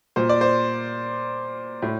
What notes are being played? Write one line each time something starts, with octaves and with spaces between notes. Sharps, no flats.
A#2 C5
D5
C5
A2